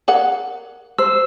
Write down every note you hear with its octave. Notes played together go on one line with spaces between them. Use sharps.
G#4 A#4 F#5
C5 E6